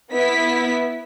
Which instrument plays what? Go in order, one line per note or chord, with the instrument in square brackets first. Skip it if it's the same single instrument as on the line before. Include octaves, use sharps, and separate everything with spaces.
[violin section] B3 E4 B6